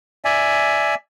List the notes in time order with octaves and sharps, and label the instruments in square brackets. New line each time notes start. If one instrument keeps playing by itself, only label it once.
[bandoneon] D5 E5 G#5